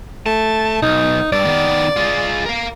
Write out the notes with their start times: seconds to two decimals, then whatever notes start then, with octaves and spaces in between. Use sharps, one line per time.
0.26 A3 A5
0.82 B1 D#4
1.32 G2 D5
1.45 D#3 B3
1.96 G#3 F4
2.45 A#4 F5